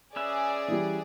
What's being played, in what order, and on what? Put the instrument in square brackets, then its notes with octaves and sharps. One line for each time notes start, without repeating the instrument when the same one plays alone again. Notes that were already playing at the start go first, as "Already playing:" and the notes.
[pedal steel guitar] C#4 B4 E5 [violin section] G#4 D5
[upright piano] E3 G3